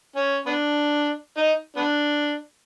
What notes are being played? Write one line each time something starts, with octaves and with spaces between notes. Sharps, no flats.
C#4
B3 D4
D#4
B3 D4